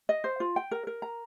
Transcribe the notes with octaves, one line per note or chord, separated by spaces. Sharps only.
D#5
C5
F4
G5
A#4
A#4
A#5